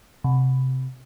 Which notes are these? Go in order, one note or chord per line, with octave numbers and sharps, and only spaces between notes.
C3